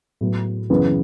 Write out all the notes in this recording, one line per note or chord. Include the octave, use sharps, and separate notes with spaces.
A2 F#3 B3
F#2 C#3 E3 B3 E4